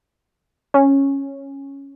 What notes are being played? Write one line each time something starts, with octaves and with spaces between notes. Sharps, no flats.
C#4